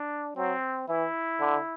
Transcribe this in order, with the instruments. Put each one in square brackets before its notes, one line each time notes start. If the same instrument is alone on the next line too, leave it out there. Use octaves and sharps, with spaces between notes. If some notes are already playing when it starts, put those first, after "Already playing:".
Already playing: [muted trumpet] D4
[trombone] F#3 [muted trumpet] C4
[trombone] E3 [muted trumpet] E4
[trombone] D3